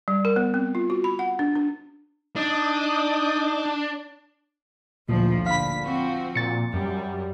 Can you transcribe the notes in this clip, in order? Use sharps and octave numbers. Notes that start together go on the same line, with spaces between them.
G3
A#4
B3
C4
F4
F#4
B5
F#5
D4
D4
D4 D#4 D6 D#6
A1 D2 A#2 F3
A#2 D3 F5 B5 B6
F3 C4 F#4
A#2 A6 C#7
F#2 G3